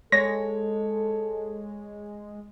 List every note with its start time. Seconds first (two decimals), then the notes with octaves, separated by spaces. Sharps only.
0.12 G#3 A4 C#5 A#6